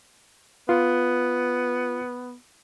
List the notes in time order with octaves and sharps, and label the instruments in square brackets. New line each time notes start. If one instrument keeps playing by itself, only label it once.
[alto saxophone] B3 [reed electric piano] F4